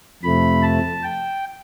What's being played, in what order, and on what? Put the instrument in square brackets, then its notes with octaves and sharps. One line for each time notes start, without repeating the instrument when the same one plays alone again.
[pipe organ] F2 C3 F3 A3 B5
A5
G5